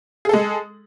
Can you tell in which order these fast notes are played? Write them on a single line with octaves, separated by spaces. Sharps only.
G#4 A4 G#3